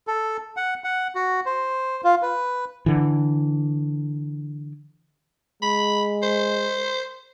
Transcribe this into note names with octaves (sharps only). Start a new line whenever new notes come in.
A4
F#5
F#5
F#4
C5
F4
B4
D3 E3
G#3 B5
C5